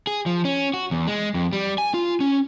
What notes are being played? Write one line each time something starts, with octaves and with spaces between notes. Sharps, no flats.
G#4
F3
C#4
F#4
E2
G#3
F2
G3
G#5
F4
C#4